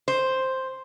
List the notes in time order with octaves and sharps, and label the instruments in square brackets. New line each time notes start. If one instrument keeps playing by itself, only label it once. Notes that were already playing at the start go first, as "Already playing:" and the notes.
[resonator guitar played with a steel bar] C5